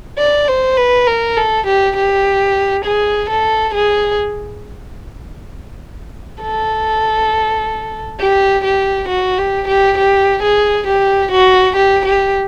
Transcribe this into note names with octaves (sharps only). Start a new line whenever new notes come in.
D5
C5
B4
A#4
A4
G4
G4
G#4
A4
G#4
A4
G4
G4
F#4
G4
G4
G4
G#4
G4
F#4
G4
G4